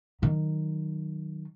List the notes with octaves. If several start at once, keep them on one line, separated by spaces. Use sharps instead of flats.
D#3 F#3